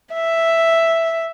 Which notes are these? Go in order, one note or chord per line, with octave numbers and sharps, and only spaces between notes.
E5